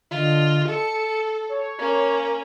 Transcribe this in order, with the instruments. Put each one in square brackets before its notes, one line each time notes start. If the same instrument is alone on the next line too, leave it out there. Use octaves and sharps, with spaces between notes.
[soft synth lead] D3 [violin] F4 D#5
[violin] A4 [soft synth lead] C#7
[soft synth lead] C#5
[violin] A#3 C#4